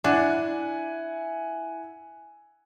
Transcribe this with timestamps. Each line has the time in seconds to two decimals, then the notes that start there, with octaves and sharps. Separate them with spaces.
0.04 D4 E4 F#5 G#5